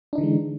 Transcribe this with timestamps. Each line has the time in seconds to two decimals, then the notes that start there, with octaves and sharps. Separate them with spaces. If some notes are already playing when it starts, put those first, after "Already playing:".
0.13 D4
0.15 D#4
0.18 D3
0.21 E3
0.23 G#3